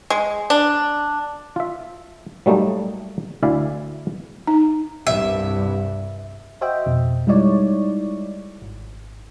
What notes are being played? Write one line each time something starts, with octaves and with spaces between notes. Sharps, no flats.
G#3
D4
F4 E5
F#3 G3 A3 A#3 D#4
D2 E4 D5 E5 F5 G#5
D#4
C2 G2 E5
F#4 C5 D#5 E5 G5
F2 B2
G3 G#3 D#4 E4 C#5 D5
G#1